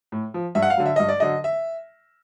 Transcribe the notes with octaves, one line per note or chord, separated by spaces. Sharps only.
A2
F3
G2 E5
F#5
F5
D3 F#3
E5
G2 D#5
D5
D3 F#3 D#5
E5